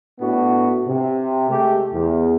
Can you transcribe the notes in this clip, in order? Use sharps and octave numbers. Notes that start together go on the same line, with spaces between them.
A2 B3 D4 F#4
C3
G#3 A3 G4
E2